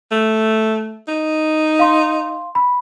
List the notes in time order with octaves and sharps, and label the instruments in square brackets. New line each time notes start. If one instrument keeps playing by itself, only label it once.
[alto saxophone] A3
D#4
[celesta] F5 C6
B5